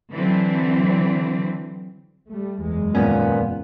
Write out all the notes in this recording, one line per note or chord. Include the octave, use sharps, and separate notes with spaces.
D3 E3 F#3 C4
G3 A3
F#1 E2 G#3
D#2 A#2 B3 C#4